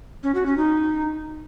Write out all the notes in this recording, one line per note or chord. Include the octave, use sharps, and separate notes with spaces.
C#4
F#4
C#4
D#4